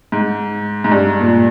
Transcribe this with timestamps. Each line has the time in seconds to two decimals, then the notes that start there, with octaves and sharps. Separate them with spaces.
0.12 G#2
0.84 G#2
0.91 G2
1.21 A#2